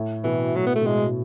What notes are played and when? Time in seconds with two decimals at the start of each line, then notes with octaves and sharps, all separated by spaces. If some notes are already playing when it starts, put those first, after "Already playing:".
Already playing: A2
0.24 B2 E3
0.56 A2 F#3
0.66 B3
0.76 A3
0.82 B2
0.86 A2 G#3